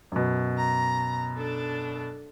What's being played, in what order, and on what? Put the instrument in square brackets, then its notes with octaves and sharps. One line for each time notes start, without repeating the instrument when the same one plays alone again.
[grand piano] F#2 B2
[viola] A#5
D4 A4